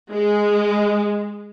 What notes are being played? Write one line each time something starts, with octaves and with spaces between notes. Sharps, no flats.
G#3